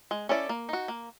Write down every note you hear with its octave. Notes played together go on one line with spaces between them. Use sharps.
G#3
C#4 E4 A4 D5
A#3
D#4 F#4
A#3